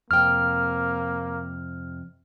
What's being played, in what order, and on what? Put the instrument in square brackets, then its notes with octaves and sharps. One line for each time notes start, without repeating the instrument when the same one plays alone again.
[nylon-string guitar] F2 C3 G5 [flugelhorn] A#3 [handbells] F6